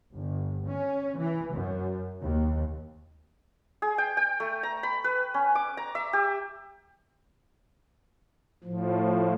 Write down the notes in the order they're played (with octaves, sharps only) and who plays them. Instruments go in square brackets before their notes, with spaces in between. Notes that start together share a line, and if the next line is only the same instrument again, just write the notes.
[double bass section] G1
C#4
E3
F#2
D#2
[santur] G#4
G5
G5
A3
A#5
B5
B4
C#4
D6
A#5
E5
G4
[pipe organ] A2 F3